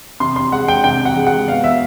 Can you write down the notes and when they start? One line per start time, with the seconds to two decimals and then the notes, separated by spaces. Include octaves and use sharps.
0.20 C3 C6
0.36 C6
0.52 G#3 F#5
0.68 G5
0.84 C3 G5
1.05 F#5
1.16 G#3
1.27 F#5
1.48 B2 F5
1.64 E5